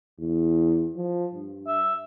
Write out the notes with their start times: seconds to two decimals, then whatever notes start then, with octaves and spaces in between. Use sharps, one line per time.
0.19 E2
0.95 F3
1.34 G2
1.67 E5